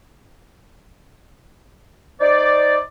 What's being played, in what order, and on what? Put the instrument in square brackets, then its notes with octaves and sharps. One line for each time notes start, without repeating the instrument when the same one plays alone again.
[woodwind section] D#4 C5 D5